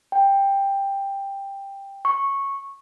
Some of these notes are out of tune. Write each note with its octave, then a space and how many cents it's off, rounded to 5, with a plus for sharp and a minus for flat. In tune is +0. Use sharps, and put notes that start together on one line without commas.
G5 +10
C#6 -10